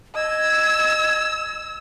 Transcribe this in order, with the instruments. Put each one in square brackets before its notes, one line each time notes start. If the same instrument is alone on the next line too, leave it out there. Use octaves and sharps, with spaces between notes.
[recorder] D#5 [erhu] E6 [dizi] G#6